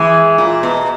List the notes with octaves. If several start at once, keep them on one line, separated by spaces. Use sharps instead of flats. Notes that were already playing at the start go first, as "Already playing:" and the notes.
Already playing: E3 G#3
A#2
B2